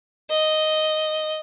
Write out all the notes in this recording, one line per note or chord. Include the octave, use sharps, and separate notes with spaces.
D#5